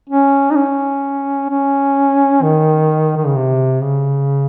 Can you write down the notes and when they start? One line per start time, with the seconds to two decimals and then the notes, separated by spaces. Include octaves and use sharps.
0.09 C#4
0.51 D#4
0.56 C#4
1.50 C#4
2.43 D#3
3.17 D#3
3.26 C#3
3.36 C3
3.82 C#3